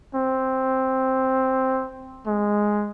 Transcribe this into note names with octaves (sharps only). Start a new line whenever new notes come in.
C4
G#3